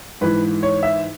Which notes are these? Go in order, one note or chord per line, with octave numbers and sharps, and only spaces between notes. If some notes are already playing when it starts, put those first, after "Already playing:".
G#2 E3 B4
C#5
E5